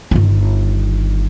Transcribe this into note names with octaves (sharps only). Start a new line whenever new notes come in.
G1 D#3